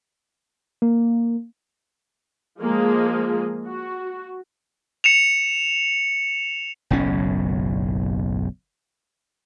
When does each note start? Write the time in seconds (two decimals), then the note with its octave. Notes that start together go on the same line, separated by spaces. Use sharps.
0.82 A#3
2.60 F3 G#3 A#3 G#4
3.66 F#4
5.04 C#7 E7 F7
6.90 F#1 B1 A2 C#4